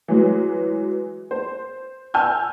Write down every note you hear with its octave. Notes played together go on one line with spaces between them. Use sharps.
E3 F#3 G#3
C5
G#5 E6 F6 G6